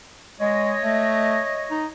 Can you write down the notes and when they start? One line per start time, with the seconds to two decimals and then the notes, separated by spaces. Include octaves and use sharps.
0.40 G#3 C#5 D#5
0.82 A3
1.71 D#4